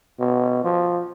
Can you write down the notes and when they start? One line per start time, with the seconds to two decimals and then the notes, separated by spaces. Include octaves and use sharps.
0.20 B2
0.64 F3